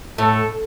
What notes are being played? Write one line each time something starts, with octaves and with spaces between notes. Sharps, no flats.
A2 A4